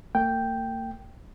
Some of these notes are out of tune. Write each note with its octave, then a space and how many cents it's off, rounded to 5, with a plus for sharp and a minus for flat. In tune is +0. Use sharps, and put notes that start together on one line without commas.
A#3 -45 G5 +0